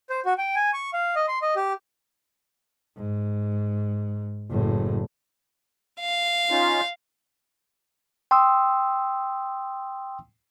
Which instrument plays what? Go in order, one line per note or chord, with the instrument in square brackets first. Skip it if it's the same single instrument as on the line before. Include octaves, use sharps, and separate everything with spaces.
[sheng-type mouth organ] C5
F#4
G5
G#5
C#6
F5
D#5
C6
D#5
G4
[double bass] G#2
F#1 A2
[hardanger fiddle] F5
[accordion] C#4 D#4 F4
[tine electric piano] G5 C6 D#6 E6